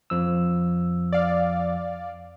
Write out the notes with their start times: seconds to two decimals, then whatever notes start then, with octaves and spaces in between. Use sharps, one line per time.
0.10 F2 F3 E6
1.12 D5 F5